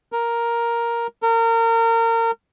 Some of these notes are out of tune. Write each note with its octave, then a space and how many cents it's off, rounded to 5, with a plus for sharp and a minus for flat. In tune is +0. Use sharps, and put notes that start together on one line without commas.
A#4 +5
A#4 -30